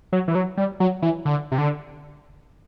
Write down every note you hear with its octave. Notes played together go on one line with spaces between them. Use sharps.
F#3
E3
F#3
G3
F#3
E3
D3
C3
D3